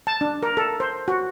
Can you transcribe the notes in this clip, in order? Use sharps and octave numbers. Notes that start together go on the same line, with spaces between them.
A5
D4
A#4
A4
C5
F#4